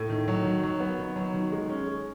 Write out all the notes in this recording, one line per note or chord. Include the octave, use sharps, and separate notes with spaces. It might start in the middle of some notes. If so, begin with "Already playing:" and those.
Already playing: A2
D#3
F#3
D#3
F#3
B3
D#3
F#3
D#3
G#3
C#4
G#3